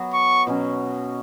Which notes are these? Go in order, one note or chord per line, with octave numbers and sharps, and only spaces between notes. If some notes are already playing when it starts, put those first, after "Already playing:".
Already playing: F#3 B3 F#4
C#6
B2 F#3 C#4